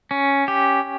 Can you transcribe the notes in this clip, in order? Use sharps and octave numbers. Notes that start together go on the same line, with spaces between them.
C#4
G4